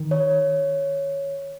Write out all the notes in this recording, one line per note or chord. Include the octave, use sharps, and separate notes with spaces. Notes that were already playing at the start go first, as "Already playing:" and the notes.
Already playing: D#3
C#5